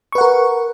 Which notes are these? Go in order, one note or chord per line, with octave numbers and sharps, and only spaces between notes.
A#4 B4 F#5 C#6